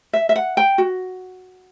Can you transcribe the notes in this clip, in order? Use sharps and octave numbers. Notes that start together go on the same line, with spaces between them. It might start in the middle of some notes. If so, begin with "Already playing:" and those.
E5
E5
F#5
G5
F#4